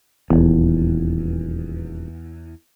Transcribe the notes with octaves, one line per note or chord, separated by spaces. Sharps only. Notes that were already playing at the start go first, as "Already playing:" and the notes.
D#1 E2